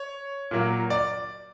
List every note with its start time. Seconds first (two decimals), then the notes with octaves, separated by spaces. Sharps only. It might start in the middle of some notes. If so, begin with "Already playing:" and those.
Already playing: C#5
0.51 A#2 F#3 A#3
0.90 D5